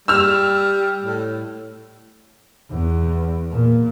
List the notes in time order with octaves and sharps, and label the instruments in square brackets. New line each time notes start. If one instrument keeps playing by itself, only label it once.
[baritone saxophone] G3 [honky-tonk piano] E6 F6
[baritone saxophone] A2
[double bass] E2
A#2